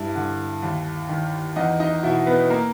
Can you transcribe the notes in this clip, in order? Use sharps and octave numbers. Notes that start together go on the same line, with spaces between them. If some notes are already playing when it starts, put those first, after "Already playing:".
Already playing: G2 E4
D3
D#2
D#3
E2 D#4 D#5
D#4 D#5
B2 E4 E5
B3 B4
A#3 A#4